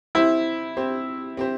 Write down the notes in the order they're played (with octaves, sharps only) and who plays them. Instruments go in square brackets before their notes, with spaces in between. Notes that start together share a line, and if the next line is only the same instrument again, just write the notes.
[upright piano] C4 G4 C5 [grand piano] E4
[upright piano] C4 G4 C5
C4 G4 C5